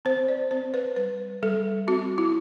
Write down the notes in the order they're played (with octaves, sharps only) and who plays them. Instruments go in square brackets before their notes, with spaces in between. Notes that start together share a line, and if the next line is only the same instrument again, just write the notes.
[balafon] C4 C5
D5
C4 C5
B4
G3 B4
G3 A4
C4 F#4
E4